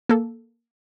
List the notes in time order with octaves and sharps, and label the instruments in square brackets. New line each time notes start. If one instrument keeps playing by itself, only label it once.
[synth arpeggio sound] A#3 A4